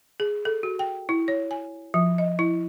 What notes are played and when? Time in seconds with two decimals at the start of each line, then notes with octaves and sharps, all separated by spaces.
0.20 G#4
0.45 A4
0.63 F#4
0.79 G5
1.09 E4
1.28 C#5
1.51 G#5
1.94 F3
2.18 D#5
2.39 E4